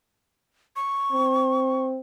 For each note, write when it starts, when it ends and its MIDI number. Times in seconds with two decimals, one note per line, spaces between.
0.76 1.86 85
1.12 2.00 60